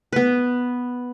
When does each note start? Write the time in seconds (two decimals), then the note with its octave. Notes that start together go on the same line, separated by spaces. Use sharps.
0.13 B3 B4